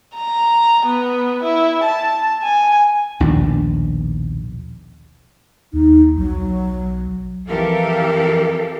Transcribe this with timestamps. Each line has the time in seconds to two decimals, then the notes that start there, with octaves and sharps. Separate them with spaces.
0.16 A#5
0.86 B3
1.43 E4
1.84 A5
2.43 G#5
3.20 A#1 D#2 B2 D4
5.73 D#2 D#4
6.17 B1 F#3
7.48 F2 E3 G4 A4 A#4 F5